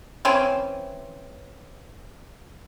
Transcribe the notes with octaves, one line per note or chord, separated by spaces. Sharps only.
E3 C4 C#4